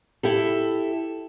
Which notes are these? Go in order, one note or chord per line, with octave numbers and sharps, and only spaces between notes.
E4 G4 A4